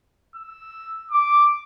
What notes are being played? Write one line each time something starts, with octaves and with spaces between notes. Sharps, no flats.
E6
D6